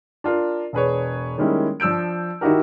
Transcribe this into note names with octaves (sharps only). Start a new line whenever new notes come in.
D4 F4 A#4
E1 G#4 B4 C#5
D#3 G3 G#3 A#3 C#4 E4
F3 D4 E6 G6 D7
D#3 D#4 E4 F#4 G4 A#4